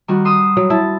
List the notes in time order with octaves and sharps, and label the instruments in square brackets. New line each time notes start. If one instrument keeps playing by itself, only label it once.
[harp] D#3 G3 F#4
C6 D#6 E6
[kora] F#3
[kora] E4 [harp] A5